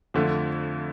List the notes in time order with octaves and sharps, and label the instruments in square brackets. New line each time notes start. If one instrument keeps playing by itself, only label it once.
[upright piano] F2 D3 A3 F4